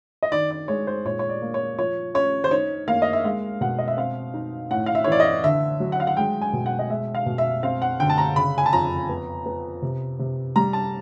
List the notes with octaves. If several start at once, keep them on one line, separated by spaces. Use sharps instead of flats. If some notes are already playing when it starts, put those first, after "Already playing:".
D#5
D#3 D5
D5
G#3 C#5
C5
A#2 C#5
C#5
D5
A#3
C#5
F3 C#5
C#4 C#5
C5
D#4 C#5
A#3 F5
D#5
E5
G#3 F5
B2 F#5
D#5
E5
C4 F5
D#4
A2 F#5
F5
E5
C#5
E3 D5
D#5
D3 E5
F#3
F#5
F5
F#5
G#3 G5
G#5
B2
F#5
D#5
G#3 E5
F5
B2
E5
C4 F5
F#5
D3 G5
A5
A#5
C#3 B5
G#5
A5
F2 A#5
B3
B3
C3
C3
G3 A#5
A5